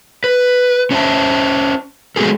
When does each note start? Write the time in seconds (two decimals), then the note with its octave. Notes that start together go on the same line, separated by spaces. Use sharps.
0.24 B4
0.91 C#4 D4 C5 D#5 E5 A5
2.16 G#3 B3 F#4 G#4 A4